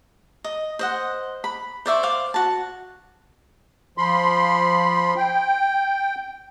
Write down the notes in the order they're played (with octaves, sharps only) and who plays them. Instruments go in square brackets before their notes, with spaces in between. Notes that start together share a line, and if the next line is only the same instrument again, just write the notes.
[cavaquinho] D#5
C5 D#5 F#5
B5
C5 D5 E5 C#6
C5 D5 F5 D6
F#4 A5
[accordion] F3 B5 C6
G5